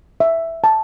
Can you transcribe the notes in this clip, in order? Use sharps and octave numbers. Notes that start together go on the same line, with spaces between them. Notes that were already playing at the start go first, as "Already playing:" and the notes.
E5
A5